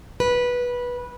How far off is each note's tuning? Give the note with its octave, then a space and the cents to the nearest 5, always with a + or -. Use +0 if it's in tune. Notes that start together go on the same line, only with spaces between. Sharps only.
B4 -15